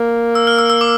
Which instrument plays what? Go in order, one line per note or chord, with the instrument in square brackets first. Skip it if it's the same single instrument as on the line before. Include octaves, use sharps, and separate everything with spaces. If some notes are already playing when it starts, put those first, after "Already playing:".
Already playing: [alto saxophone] A#3
[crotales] E6
F6
E6
E6
D6